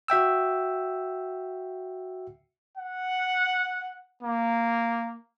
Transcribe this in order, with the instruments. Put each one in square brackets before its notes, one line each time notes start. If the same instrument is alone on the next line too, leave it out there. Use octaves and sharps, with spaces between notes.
[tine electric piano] F#4 E5 G5 E6
[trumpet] F#5
A#3